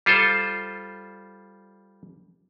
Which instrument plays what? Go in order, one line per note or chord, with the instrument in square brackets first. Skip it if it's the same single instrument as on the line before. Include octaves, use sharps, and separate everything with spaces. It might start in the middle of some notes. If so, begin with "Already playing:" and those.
[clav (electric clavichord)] G3 F4 A4 C5